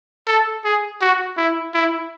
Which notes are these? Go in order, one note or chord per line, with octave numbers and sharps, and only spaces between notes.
A4
G#4
F#4
E4
E4